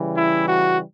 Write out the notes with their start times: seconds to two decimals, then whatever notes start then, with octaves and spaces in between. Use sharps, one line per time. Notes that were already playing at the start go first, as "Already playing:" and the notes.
Already playing: C#3 E3 G3
0.17 E4
0.47 F#4